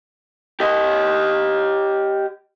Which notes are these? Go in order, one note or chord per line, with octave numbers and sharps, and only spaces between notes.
G4 D#5